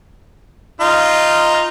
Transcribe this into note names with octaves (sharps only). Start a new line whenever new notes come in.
D#4 F4